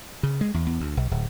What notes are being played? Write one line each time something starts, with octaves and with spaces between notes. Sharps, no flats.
C#3
G#3
E2
E2
D2
B1
D1